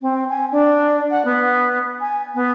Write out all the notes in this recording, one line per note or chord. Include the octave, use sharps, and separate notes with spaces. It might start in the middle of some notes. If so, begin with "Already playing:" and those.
C4
G#5
D4
F#5
B3
G#5
B3